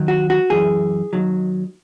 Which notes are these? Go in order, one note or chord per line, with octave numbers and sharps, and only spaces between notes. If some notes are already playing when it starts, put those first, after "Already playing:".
Already playing: D#2 D#3 F#3
F#4
F#4
F#2 E3 G#4
D#2 D#3 F#3